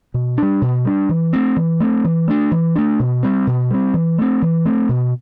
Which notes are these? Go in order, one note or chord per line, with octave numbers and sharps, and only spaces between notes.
B2
G3 D4
B2
G3 D4
E3
A3 C4
E3
A3 C4
E3
A3 D4
E3
A3 D4
B2
G3 C4
B2
G3 C4
E3
A3 C4
E3
A3 C4
B2